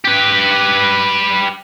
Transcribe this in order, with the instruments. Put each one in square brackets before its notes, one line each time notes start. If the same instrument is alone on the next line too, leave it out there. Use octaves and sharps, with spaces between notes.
[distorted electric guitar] G4 B4